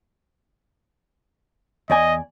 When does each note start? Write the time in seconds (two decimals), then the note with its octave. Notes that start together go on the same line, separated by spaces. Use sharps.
1.90 E2 D5 D#5 G#5